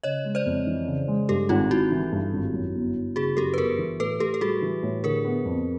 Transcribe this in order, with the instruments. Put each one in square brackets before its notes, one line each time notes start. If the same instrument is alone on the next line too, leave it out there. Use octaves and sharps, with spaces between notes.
[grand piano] C#3 [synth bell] C#5 D#5
[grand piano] G#3
[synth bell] C5 D5
[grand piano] F2
E3
C#3
G#3
[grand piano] G2 [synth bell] G4 A4
[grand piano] G#1 [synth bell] D#4 F4
[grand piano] G#1 [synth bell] E4 F#4
[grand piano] E3
G2
G#1
F#2
G1
G1
[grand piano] C#3 [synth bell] F#4 G#4
[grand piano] F#2 [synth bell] G4 A4
[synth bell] B4
[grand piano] G1 [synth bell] G#4 A#4
[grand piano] E3
[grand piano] A2 [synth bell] A4 B4
[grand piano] A2 [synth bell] G4 A4
[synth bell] A4
[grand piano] G3 [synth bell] F#4 G#4
[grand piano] E3
A2
[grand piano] D3 [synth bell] G#4 A#4
[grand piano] B3
F2